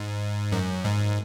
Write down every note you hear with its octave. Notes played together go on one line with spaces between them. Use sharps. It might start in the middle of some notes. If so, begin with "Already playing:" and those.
Already playing: G#2
F#2
G#2